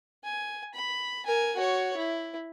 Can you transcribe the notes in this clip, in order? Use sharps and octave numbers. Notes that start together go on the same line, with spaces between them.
G#5
B5
A#4 G#5
F#4 C#5
E4